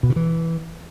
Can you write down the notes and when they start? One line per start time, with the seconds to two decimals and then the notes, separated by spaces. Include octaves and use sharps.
0.03 B2
0.10 C#3
0.16 E3